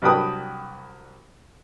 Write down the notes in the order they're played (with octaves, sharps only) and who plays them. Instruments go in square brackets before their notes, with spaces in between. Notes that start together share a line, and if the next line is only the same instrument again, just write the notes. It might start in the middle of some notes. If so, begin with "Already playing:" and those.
[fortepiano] C2 F#3 D4 B4 G5 D#6